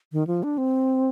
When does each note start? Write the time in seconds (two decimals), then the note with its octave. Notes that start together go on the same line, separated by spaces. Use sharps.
0.12 D#3
0.27 F3
0.43 D4
0.58 C4